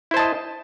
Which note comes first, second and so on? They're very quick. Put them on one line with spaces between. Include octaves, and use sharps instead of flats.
E4 C5 A5 D#5